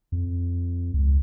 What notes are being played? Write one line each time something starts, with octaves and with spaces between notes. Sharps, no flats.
F2
C#2